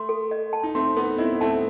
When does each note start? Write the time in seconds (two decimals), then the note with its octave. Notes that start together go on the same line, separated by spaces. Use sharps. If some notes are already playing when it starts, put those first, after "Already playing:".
Already playing: A3 C6
0.09 A4
0.31 D#5
0.53 A5
0.63 D#4
0.75 A3 C4 C6
0.97 B3 D#4 A4
1.18 C4 E4 D#5
1.41 A3 C4 A5